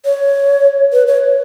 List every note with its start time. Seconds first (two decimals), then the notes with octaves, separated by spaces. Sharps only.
0.05 C#5
0.93 B4
1.07 C#5